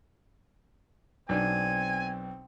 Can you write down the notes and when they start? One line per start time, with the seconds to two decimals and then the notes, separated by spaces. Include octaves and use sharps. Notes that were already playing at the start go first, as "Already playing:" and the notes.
1.29 B1 C4 D4 G#5